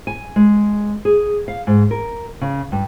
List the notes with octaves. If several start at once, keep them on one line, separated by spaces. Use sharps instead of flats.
G#5
G#3
G#4
F5
G#2
A#4
C#3
G2